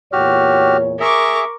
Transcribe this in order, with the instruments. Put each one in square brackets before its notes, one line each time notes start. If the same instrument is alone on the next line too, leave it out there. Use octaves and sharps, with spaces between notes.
[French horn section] E2 A#2 C#5 [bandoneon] F#4 G4 F6
[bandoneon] G#4 E5 [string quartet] A#4 C#6 D6